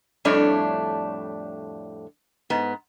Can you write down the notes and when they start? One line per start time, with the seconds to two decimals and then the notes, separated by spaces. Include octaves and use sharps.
0.25 F2 A2 G3 A3 D4 C#5
2.50 G#2 B3